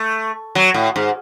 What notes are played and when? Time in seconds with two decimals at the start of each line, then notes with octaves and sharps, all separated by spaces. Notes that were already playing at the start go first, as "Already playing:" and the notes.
Already playing: A3
0.55 F#3
0.74 A2
0.96 G#2